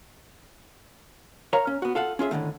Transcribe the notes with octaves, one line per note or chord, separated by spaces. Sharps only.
A#4 C#5 F5 A#5
C#4
B3 F#4
F4 A4 F5 F#5
C#4 F4 G#4 E5
A2 D3 D#3 A3